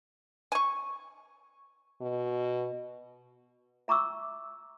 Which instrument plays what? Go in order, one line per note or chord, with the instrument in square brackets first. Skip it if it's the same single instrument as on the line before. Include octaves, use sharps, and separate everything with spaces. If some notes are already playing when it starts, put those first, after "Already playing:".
[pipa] G#5 C#6
[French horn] B2
[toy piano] E5 A#5 C#6 D6 E6